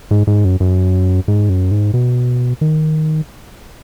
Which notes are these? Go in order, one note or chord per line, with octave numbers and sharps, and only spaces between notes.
G#2
G#2
F#2
F#2
G#2
F#2
G#2
B2
D#3